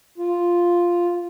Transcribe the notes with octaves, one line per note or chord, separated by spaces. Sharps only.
F4